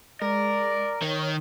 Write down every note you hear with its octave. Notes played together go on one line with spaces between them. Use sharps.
G#3 A#4 D5
D#3 C#5